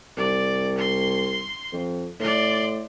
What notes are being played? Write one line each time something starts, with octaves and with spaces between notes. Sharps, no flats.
C2 D5
C6
F2
A2 D5 C6